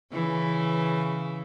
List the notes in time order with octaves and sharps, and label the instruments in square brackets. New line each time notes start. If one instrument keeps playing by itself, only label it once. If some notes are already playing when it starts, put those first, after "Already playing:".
[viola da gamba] C#3 E3